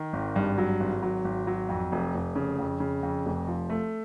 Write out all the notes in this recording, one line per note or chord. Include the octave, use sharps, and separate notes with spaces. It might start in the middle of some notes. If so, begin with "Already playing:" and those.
Already playing: D#3
G#1
G2
F#3
G#1
F#3
G#1
F#3
F2
F1
F1
C#3
F2
C#3
F2
F1
F3
A3